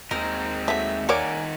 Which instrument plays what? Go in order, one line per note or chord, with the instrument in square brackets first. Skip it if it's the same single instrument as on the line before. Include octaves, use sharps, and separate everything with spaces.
[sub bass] D#2 [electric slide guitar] G#3 C4 D#4 [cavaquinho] A#4
[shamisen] F#3 A3 [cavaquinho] E5
[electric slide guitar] D#3 F#5 [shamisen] A#3 C#5 D5 [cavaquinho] A#4 G#5 D6